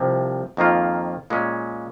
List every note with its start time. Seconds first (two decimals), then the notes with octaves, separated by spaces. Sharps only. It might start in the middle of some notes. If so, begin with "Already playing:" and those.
Already playing: C2 C3 F3
0.57 F2 D#3 A#3 F4
1.30 A#2 G#3 C#4